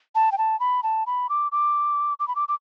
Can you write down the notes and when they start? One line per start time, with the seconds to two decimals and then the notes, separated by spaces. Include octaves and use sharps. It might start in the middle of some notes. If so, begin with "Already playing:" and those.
0.15 A5
0.32 G5
0.38 A5
0.60 B5
0.83 A5
1.07 B5
1.29 D6
1.52 D6
2.20 D6
2.28 B5
2.36 D6
2.48 D6